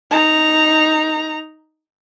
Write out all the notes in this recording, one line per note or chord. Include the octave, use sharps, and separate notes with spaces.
D#4 A#5